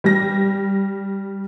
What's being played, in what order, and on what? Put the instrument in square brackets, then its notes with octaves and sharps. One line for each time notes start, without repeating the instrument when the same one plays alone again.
[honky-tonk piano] G3 A#6